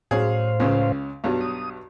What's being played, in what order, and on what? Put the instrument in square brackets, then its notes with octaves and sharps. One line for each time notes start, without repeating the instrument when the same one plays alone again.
[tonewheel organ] A2 C5 F5 [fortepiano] F#3 C#4 G#4
[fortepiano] C#2 C#3
B1 G2 F#3
[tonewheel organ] D#6